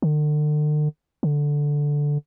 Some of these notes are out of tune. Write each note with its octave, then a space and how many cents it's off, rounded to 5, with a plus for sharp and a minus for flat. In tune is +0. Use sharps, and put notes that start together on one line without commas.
D3 +40
D3 -5